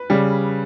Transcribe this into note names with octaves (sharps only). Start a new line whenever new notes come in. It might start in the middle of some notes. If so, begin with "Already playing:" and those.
Already playing: B4
C#3 G3